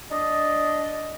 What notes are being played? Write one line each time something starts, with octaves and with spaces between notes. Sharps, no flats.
D4 D5 D#5